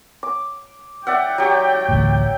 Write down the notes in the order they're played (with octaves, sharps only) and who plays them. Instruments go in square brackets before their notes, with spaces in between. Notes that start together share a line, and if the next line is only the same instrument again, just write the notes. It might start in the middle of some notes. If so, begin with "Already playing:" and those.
[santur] D6
[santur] D5 E5 F#5 [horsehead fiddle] G5
[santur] F#3 G4
[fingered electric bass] A1 D2 A2